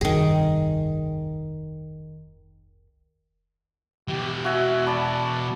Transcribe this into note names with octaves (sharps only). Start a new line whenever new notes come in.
F1 C2 G2 D#3 G#4
B2 E3 G4
F#4 E5 G#5
D5 A5 B5